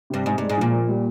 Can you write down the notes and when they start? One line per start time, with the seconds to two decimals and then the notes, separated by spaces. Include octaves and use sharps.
0.10 G2 C3
0.26 G#2 D#4
0.38 G2 G#3
0.49 G#2
0.58 A#2 F3
0.73 A#3
0.88 G3